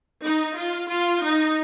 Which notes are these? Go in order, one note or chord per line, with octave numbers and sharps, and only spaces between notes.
D#4
F4
F4
D#4